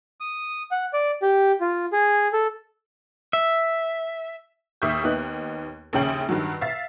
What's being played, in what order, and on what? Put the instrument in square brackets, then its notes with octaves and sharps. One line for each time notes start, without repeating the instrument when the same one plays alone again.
[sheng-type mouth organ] D#6
F#5
D5
G4
F4
G#4
A4
[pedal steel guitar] E5
[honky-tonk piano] D#2 E5 C#6 D#6 G6
D#2 B3 D#4 F#6
A#1 D#2 C#3 C#5 G5 F#7
G2 D#3 F#3
E5 F5 A6